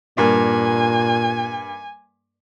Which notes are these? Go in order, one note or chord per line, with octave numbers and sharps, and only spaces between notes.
G2 A#2 A#3 G#5